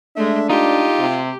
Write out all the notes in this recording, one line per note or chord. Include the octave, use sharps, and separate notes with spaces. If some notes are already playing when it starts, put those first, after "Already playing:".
G#3 A3 D4 E5
D#4 F4 G4
C3